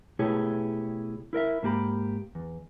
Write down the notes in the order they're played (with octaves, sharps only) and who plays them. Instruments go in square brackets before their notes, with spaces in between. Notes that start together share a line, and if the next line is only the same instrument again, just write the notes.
[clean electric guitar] B2 A3 E4 G4 G#4 C#5
E4 A#4 D#5 E5
G#2 A#3 G4 B5
E2